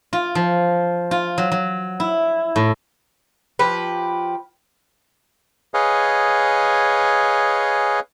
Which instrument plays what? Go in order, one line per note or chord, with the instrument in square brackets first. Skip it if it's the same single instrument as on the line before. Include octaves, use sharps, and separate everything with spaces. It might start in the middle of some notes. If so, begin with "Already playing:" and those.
[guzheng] F4
F3
F4
F#3
F#3
E4
A2
[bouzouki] F3 G4 B4
[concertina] G#4 B4 C#5 D#5 F5 G#5